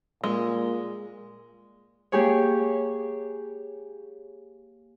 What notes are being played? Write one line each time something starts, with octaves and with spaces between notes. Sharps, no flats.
A#2 G#3
A#3 G4 G#4 C#5